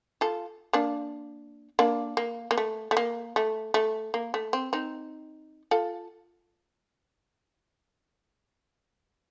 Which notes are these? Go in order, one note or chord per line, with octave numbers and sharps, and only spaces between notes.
F4 A4
A#3 D4
A#3 D4
A#3
A#3
A3
A3
A#3
A3
A3
A#3
A3
C4
C4 D#4
F4 A4